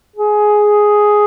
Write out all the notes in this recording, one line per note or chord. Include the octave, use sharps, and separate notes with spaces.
G#4